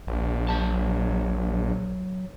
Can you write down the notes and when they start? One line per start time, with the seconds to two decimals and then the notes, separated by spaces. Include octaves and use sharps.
0.07 A#1
0.49 F#3 A5